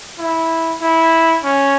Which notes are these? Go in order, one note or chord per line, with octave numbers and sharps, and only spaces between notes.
E4
E4
C#4